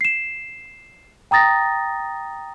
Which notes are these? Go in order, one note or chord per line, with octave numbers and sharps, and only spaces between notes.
C7 E7
G5 A#5 D#6 A6 A#6